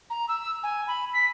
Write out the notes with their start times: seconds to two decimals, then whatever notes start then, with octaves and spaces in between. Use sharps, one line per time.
0.09 A#5
0.28 E6
0.63 G#5
0.87 B5
1.13 B6